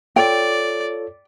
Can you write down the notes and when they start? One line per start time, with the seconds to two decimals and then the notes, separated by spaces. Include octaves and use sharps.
0.16 F4 A4 C#5 D5 G5